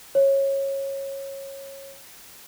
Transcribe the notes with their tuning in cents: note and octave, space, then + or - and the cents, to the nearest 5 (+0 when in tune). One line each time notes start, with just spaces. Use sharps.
C#5 -20